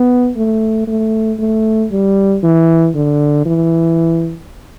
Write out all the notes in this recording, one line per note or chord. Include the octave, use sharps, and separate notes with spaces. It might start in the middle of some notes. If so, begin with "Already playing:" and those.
Already playing: B3
A3
A3
A3
G3
E3
D3
E3